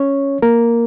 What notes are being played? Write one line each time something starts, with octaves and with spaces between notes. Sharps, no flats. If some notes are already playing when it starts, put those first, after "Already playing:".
Already playing: C#4 C#5
A#3 A#4